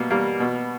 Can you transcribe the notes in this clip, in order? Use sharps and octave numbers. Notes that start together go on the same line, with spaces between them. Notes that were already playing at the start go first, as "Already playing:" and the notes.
Already playing: B2 G3 A#3
G3 A#3
B2